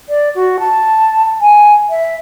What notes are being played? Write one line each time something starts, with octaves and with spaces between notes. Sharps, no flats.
D5
F#4
A5
G#5
E5